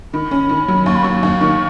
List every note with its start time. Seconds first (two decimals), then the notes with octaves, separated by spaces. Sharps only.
0.14 D#3 B5
0.31 C#4
0.49 D#3
0.68 F#3
0.86 D#2 C#6
0.95 B5
1.03 F#3 C#6
1.23 D#2
1.41 D#3